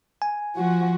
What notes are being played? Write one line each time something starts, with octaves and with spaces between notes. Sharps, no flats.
G#5
F3 F#4